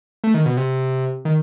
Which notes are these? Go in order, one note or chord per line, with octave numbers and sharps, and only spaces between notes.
A3
D#3
B2
C3
D#3